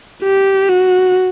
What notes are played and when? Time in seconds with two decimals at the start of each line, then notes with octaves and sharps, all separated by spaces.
0.23 G4
0.69 F#4